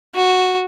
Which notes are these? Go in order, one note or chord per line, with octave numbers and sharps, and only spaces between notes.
F#4